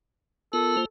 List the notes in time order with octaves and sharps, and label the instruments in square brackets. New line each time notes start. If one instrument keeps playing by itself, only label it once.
[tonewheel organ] B3 F4 A#4 [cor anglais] A4
[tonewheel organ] A#3 F4 C5